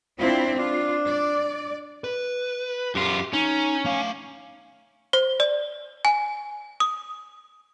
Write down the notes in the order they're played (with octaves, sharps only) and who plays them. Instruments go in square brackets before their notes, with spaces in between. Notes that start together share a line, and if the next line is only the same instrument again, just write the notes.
[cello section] C4 D4 E4 [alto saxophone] F4
[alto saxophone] D4 [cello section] F4
[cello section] D5
[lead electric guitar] B4
[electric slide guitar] F#2 F4 [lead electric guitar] G4
[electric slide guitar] C#4 [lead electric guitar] D#4
[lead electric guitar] A3 F5
[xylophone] C5
D5
G#5
D#6